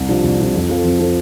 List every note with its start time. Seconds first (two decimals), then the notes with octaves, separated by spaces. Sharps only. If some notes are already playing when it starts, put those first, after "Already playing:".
Already playing: C2
0.09 C3 F3 D4
0.24 C2
0.39 C3 F3 D4
0.54 F2
0.69 F3 C4 A4
0.84 F2
0.99 F3 C4 A4